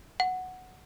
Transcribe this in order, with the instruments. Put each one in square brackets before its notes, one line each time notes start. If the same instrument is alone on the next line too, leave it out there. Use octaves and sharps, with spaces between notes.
[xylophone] F#5